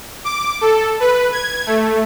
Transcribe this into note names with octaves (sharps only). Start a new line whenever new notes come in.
D6
A4
B4
G#6
A3